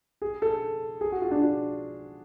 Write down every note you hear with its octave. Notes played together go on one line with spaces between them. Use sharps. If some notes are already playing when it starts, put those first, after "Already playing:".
G#4
A4
G#4
F#4
F4
D4
F4